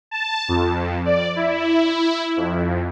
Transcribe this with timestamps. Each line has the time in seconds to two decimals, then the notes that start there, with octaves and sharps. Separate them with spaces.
0.11 A5
0.48 F2
1.05 D5
1.36 E4
2.37 F2